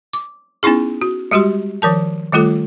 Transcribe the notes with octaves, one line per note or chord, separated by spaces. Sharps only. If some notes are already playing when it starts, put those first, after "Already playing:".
D6
B3 C#4 D#4 E4 G#4
F#4
G3 G#3 F#4 G4 C6
D#3 F3 A#4 A5
D#3 G3 A3 F4 A4